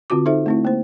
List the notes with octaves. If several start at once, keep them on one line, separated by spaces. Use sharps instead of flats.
D3 C4 F4 F#4 D6
D#4 A4 C5 E5
A3 C4 E4
A#3 C5